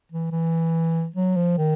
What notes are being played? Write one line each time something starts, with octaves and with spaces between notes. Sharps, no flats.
E3
E3
F#3
F3
D#3